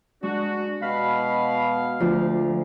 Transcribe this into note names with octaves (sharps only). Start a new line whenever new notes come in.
G#3 D4 F#4
B2 F5 B5
D2 F3